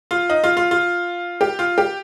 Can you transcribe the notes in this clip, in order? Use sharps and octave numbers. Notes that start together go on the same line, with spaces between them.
F4
D#4
F4
F4
F4
G4
F4
G4